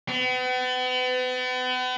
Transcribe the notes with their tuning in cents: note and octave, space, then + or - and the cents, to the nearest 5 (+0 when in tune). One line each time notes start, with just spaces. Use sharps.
B3 +40